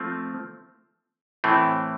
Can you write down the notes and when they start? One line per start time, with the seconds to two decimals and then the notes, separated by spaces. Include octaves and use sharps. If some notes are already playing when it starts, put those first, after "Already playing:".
Already playing: F3 A3 C4
1.44 A2 E3 A3 C4